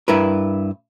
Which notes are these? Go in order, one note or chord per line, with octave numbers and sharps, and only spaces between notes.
G2 E4 A#4 B4